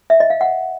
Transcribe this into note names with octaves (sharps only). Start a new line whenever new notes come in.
E5
D#5
F5
F#5